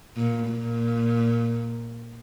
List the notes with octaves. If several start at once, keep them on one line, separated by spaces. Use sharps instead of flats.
A#2
A#2